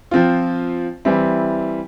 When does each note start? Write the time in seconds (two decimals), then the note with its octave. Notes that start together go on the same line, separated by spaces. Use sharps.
0.11 F3 C4 F4
1.05 E3 G3 C4 E4